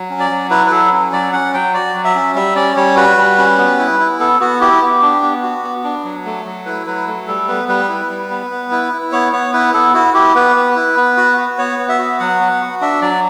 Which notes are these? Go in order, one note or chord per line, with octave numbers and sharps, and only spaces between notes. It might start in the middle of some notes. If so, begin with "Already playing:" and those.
Already playing: F#3
C#4
D5
F#3
E4 B4
B4
F#3 A4
C#4
F#3 D5
C#4 F#5
F#3 G5
F#4 D5
F#3
E5
C#4
G3 E5
C#4 D5
G3 C#5
F#4 B4
G3
C#4
B3
E4
E4
B3 A4
B3 F#4
E4 G4
B3
D4
B3
F#4
B3
D4
F#3
A3
F#3
E4 B4
F#3 B4
A3
G3 A4
B3 B4
G3 B4
E4
G3
B3
B3
E4
E4
B3 C#5
B3 C#5
E4 B4
B3 A4
E4 F#4
E4 G4
B3 B4
B3
E4
B3
F#4
F#4
B3 C#5
B3
E5
F#4
F#3 F#5
B3
F#4
D4 E5
F#3 D5